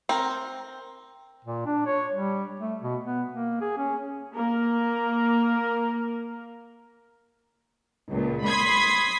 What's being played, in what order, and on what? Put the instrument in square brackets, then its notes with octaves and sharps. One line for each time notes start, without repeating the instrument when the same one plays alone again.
[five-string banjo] C4 A#4
[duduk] A#2
D4
C#5
G3
A3
B2
B3
A#3
G#4
C#4
[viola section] A#3 A#4
[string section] C#2 A#2
B5 C6 D#6 G#6 B6